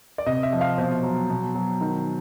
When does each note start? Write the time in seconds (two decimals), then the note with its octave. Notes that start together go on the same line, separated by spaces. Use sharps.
0.18 D5
0.26 C3 D#5
0.43 E5
0.53 F3
0.61 F5
0.78 B2 C5
1.03 F#3
1.30 B2
1.55 F#3
1.81 D#3